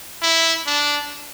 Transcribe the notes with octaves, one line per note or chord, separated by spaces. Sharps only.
E4
D4